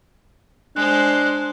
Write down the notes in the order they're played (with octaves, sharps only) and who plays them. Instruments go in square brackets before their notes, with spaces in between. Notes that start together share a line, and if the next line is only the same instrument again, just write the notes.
[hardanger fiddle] G#3 C5 [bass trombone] D4 [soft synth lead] F#6